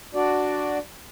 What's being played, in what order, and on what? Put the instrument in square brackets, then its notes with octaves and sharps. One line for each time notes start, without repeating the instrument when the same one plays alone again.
[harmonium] D4 F#4 D5